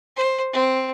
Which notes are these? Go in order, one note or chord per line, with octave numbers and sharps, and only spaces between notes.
C5
C4